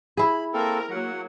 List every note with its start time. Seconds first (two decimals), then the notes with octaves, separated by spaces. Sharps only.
0.17 E4 G#4 B5
0.54 A#3 C4 A4 A#4
0.91 F#3 A#3 F#5